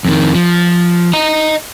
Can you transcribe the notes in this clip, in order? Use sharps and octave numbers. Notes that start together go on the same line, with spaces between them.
F2 D#3
F3
D#5 A#5